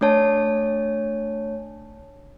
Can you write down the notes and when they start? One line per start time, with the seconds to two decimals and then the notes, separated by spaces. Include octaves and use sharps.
0.01 A3 D4 C#5 A5